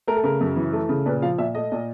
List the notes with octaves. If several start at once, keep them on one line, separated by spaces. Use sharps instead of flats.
A3 A#4
A4
C#3 A#4
F#2
E3
A3
C#3
A#2 B4
F3 F5
A#2 E5
A3 D#5
A#2